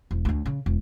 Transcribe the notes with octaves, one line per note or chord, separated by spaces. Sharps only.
E1
D2 D4
C#3
E1